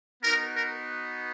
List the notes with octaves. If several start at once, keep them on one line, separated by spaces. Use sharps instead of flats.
B3 D#4 F#4 A#4
A#4